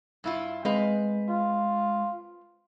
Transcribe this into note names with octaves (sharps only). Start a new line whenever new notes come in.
G2 E4 F4
G#3 C4 B4 F5
F4